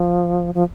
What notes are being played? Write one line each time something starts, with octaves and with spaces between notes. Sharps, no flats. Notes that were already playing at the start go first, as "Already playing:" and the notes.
Already playing: F3
F3